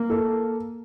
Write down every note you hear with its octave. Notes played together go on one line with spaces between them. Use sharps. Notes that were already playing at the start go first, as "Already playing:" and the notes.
Already playing: A#3
A4